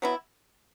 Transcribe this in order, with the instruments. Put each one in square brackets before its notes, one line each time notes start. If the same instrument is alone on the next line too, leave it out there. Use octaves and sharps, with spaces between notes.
[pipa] F#3 B3 E4